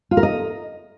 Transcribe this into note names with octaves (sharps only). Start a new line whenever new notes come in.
F4
A#4
D#5